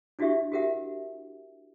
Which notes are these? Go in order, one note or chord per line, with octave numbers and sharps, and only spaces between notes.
D4 E4 F#4 G4 E5 C#6
F#4 G4 A#4 E5 F#5